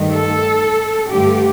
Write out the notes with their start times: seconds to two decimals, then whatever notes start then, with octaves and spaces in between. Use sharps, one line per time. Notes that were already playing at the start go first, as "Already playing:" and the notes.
Already playing: G2 D#3 A3
0.14 A4
1.10 G2 D3 A3 G4